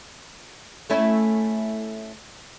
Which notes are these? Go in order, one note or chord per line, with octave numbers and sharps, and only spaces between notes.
A3 C#4 E4